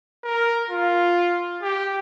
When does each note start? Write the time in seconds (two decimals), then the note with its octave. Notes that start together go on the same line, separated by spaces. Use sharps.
0.24 A#4
0.69 F4
1.62 G4